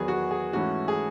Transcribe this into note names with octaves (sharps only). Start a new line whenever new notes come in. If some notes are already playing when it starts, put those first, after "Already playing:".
Already playing: E2 D#3 F#3 B3 G#4
F#4
G#4
G#2 E3 A3 C#4 E4 F#4
G#4